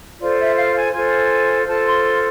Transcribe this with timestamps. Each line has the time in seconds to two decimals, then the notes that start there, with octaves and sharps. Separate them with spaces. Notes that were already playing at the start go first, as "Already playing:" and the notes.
0.19 F4 A4 C5 D5
0.38 E5
0.56 F5
0.75 G#5
0.92 F4 A4 C5 G#5
1.66 F4 A4 C5 A5
1.85 C6
2.02 C6